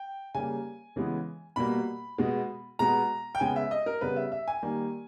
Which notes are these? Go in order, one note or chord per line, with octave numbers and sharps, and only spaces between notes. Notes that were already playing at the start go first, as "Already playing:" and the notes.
Already playing: G5
C#3 G3 A#3 G#5
C#3 E3 G#3 B3
B2 G3 A#3 B5
B2 G#3 B3
B2 G#3 B3 A#5
G5
C#3 G#3 B3 G#5
E5
D#5
A#4
C#3 G3 B3 B4
E5
E5
G#5
D#3 G3 A#3